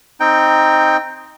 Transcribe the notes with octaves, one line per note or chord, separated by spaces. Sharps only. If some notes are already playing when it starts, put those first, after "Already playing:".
C4 D#4 G5